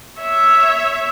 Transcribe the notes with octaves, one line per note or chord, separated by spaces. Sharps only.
C#5 E5